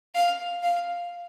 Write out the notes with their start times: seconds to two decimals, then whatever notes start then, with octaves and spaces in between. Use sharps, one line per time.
0.14 F5
0.63 F5